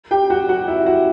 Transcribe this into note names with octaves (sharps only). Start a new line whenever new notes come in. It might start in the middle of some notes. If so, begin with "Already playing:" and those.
G4 G5
F#4 F#5
F#4 F#5
E4 E5
F#4 F#5